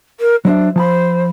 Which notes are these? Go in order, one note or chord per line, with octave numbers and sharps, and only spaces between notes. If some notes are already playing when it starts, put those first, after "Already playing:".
A#4
F#3 D4 C5 E5
F3 C5 A5 B5